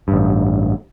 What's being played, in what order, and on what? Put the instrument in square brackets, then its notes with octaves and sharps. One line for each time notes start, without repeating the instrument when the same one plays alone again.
[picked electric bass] A1 G2